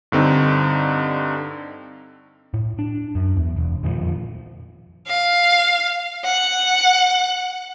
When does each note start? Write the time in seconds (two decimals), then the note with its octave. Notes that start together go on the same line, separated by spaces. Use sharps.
0.12 G2 D3 C4 D#4
2.54 A2
2.79 D4
3.15 F#2
3.37 E2
3.56 E1
3.83 F2 A#2 D#3 F3
5.07 F5
6.25 F#5